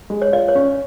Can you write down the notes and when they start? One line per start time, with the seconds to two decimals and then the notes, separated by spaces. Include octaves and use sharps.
0.10 G#3
0.22 C#5
0.33 F4 D5
0.48 C#5
0.55 C#4